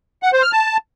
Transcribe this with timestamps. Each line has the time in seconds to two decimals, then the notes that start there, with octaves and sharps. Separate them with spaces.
0.23 F#5
0.33 C5
0.42 F6
0.52 A5